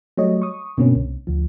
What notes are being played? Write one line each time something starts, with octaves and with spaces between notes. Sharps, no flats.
F#3 G3 A3 C#5 D#5
C#6 D#6
G2 B2 D3 A#3 C4 C#4
C2
D2 F3